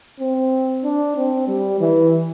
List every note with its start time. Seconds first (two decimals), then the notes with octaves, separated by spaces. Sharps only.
0.20 C4
0.84 D4
1.16 C4
1.48 G3
1.80 E3